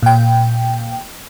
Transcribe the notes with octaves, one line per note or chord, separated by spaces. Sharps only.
A#2 G5